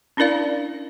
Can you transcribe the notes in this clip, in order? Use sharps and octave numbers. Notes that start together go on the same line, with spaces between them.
C#4 D4 E4 A#4 D5 F5